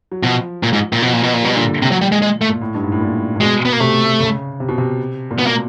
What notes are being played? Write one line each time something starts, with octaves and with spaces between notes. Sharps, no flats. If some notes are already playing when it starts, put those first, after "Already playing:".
F#3
B2 F3
A#2
G#2
A#2
B2 F3
A#2
B2
A#2
B2 G3
A#2 D3
A#2
C3
F#3
G3
G#3
G#3
A3
A#2
A2
G2
G#2
A2
A#2
A#2
B2 G#3
B3
A#3
C3 A3
C#3
C3
B2
C3
A#2
B2 B3
A#3